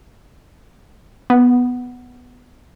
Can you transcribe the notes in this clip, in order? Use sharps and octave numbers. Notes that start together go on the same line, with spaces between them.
B3